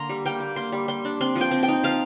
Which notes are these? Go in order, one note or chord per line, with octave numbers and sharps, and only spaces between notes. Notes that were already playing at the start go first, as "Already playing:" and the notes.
Already playing: D3 A#3 A#5 C6
G3
A#3 G5
A#3
A#3 C6
G3
G3 C6
D4
C4 C6
F3
G5
C4
G5
D#4
F3 F5